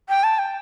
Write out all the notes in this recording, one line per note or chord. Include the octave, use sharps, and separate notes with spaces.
G5
A5
G5